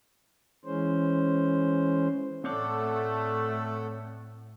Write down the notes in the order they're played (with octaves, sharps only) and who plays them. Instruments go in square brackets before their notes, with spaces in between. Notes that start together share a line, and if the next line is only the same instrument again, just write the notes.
[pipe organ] E3 G#3 C#4 C5
[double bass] A2 [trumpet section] A3 [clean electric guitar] C4 C#5 D5 [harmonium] A4 F#5